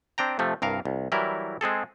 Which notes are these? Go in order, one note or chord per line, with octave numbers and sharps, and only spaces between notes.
C4 D4 G5 A#5
C3 F3 A3
C2 G2 A#4 F5
C2
E3 F#3 G3 E4 A#4
G#3 C4 G#4 A4